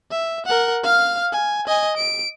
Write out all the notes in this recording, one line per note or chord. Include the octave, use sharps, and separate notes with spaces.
E5
A#4 F#5
F5 F6
G#5
D#5 G#5
D7